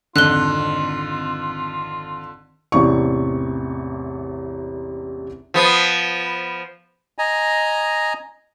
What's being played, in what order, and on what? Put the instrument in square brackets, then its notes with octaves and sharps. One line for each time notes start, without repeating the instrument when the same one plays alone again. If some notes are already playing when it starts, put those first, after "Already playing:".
[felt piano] G#1 F2 [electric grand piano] D3 [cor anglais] F4 [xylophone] F#6 G7
[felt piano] A1 E2 C3 D5 C#6
[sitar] F3 B3
[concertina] D#5 G#5 A#5